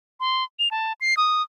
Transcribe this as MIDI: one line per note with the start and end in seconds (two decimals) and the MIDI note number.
0.20 0.44 84
0.59 0.68 101
0.71 0.93 81
1.01 1.17 96
1.17 1.42 87